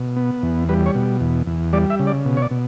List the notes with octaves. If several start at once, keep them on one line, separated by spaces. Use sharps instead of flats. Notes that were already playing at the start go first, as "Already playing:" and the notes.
Already playing: B2
B3
E2
G3 B4
C#5
B2
E2
E2
G3 D5
E5
C#3
D5
B2
C#5
D5
B2